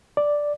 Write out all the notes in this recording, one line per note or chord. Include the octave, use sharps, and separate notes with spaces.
D5